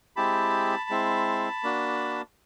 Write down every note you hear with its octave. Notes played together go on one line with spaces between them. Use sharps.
G#3 C4 E4 G4 A5 B5
G#3 C4 E4
A#3 D4 F#4